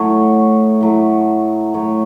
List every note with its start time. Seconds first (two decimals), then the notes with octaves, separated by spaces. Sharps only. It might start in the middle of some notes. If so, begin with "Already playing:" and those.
Already playing: A2 F#3 A3 C#5
0.81 A2 F#3 A3
1.74 A2 F#3 A3 C#5